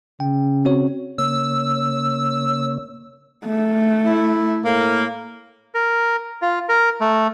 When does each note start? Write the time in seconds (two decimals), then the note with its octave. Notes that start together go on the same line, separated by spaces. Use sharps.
0.20 C#3 G5
0.65 C4 F#4 C#5
1.18 C#3 A#3 C#5 E6
3.46 A3
4.05 E4
4.64 A2 A#3
5.74 A#4
6.42 F4
6.69 A#4
7.01 A3